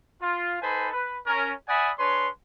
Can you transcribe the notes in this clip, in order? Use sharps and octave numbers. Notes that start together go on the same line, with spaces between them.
F4
D#4 A4 B4 C5 G#5 B5
B4
C#4 A#4
D5 E5 F#5 G#5 B5 D#6
D4 G#4 B4 C#5 C6